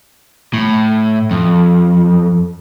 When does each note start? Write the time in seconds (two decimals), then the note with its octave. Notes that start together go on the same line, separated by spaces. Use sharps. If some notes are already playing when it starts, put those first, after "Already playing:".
0.54 A2
1.31 F2